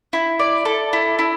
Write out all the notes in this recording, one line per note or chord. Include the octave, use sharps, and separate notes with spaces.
E4
D5
A4
E4
E4